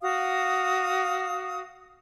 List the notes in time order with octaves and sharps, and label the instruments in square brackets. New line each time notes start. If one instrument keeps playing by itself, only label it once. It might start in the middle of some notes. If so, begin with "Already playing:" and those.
[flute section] F#4 F5 D#6